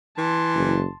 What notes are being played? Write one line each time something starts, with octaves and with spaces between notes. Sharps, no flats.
E3 A5 C6
F#1